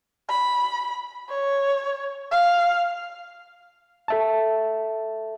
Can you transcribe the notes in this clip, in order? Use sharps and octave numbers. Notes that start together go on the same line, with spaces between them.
B5
C#5
F5
A4 E5 A5